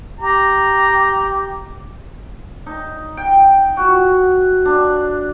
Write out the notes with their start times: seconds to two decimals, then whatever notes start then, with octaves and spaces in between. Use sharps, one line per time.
0.19 G4 A#5
2.66 D#4
3.17 G5
3.77 F#4
4.65 D4